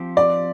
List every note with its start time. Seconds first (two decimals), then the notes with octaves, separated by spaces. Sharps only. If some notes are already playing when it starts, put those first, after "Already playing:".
Already playing: F3 C4 G4
0.17 D5